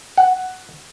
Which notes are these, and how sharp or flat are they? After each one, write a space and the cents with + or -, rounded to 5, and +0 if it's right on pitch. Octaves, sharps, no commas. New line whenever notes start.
F#5 +5